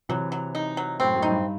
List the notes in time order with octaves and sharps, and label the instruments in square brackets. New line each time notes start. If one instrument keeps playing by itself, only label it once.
[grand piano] C3 E3 [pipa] F#3
[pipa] F#3
D#4
F#3
[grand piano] F#2 A2 [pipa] C4
[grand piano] F#2 A2
[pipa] D#4
[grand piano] G2